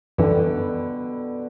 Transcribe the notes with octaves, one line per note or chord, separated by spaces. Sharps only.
F#2 B2 D3 E3 G3